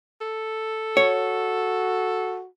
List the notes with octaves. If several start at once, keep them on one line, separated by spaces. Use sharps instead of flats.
A4
F#4 C#5